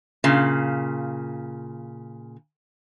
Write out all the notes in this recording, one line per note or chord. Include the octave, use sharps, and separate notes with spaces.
A#2 C#3